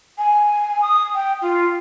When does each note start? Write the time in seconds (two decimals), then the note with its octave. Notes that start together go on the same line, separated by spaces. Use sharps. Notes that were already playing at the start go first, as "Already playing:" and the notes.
0.18 G#5
0.82 D#6
1.14 G5
1.42 F4